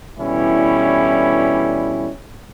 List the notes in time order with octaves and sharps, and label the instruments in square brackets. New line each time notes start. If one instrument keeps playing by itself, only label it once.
[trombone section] B2 D3 E3 G3 C#4 E4